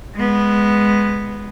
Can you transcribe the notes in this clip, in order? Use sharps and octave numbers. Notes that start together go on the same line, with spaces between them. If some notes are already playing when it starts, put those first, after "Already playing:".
G#3 B3